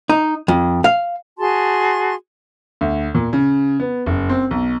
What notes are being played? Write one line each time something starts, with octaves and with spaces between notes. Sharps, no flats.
D#4
F2
F5
F#4 G#4 A5 C6
D2
A#2
C#3
B3
F#1
C4
B1